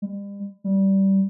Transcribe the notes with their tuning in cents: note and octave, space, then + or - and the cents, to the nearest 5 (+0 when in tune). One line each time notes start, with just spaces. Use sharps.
G3 +40
G3 -15